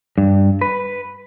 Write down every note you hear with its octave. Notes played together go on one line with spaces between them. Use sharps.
G2
B4